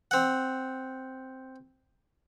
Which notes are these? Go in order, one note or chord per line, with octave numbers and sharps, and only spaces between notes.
C4 F#5